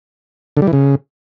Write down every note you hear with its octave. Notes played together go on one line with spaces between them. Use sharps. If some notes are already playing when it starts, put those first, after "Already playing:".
D3
G3
E3
C#3